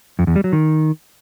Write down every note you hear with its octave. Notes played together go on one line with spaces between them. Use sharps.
F2
E2
G3
F#3
D#3